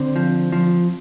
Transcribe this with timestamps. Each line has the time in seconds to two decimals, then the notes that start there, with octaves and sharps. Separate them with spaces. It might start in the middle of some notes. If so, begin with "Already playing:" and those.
Already playing: D3 C4
0.16 F3
0.52 F3